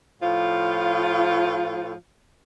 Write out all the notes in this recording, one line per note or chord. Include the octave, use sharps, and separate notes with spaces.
A2 F3 F4